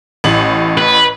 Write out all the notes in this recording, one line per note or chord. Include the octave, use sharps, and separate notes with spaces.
A1 A2 F#7
B4